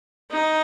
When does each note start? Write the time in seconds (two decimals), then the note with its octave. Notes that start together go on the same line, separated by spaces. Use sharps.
0.31 D#4